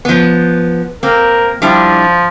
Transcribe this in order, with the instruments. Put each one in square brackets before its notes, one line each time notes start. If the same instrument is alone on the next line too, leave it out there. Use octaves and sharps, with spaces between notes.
[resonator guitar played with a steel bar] F3 B3
[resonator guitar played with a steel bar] A#3 C4 [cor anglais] A#4
[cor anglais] F3 [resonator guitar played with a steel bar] G3 D4 E4